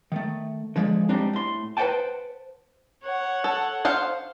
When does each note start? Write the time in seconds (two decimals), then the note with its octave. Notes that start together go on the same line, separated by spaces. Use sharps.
0.12 D#3 A3
0.76 D3 F3 G#3
1.09 G3 G#3 C4 D4 D#4
1.33 A2 C6
1.77 B4 C5 D#5 F#5 G5 A5
3.04 C#5 F#5
3.44 A4
3.85 C5 F5 F#5